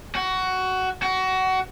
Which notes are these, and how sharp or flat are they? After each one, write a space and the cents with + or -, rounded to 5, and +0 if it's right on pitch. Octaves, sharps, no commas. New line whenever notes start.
F#4 +15
F#4 +20